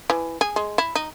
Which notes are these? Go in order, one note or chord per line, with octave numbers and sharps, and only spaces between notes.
E3
G#4
G#3
E4
D#4